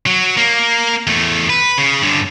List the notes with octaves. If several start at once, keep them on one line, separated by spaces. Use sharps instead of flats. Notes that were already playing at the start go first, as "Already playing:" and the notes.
F#3
A#3
E2 A3
B4
C#3
G2 D3